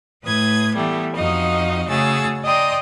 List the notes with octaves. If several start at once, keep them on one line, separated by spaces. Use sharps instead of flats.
A2 B4 D#6 G#6
E3 G3 A3 B3
F2 D#4 F#4 D#5 F5
C#3 A3 F#4 G#4 E6 A6
D5 D#5 G5 A#5 C6 D#6